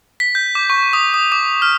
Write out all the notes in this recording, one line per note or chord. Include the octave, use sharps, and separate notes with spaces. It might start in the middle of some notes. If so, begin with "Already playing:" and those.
B6
G6
D6
C#6
D#6
D#6
D6
F6